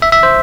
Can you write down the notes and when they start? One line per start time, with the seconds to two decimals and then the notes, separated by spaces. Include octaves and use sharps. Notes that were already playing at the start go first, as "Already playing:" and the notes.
0.02 E5
0.12 E5
0.23 C5